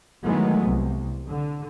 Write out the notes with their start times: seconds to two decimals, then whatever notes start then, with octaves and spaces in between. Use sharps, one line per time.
0.22 D#3 E3 F#3 G#3 A3 B3
0.65 C2
1.27 D3